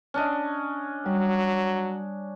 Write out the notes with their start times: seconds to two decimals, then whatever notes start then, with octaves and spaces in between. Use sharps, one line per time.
0.14 C#4 D4 D#5
1.06 F#3 G3